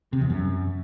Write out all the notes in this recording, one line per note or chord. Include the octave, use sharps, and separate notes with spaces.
C3
E2
F#2